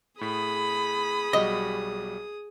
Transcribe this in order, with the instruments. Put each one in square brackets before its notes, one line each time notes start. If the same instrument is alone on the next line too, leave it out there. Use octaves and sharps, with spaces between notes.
[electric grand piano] A2 B6 [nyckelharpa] G#4 D#6 [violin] B5
[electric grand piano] B1 G3 F#4 [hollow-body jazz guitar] D#5